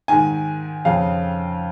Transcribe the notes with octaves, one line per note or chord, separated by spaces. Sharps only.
G#2 D#3 G#5
F2 C#3 F5